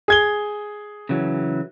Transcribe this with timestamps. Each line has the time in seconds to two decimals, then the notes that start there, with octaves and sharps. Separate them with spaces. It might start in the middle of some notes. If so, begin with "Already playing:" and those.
0.08 G#4 G#6 G7
1.09 C#3 E3 F#3